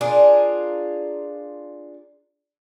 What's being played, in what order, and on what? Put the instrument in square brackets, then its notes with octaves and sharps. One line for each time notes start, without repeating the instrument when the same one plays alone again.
[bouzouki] D4 F4 G#4 A#4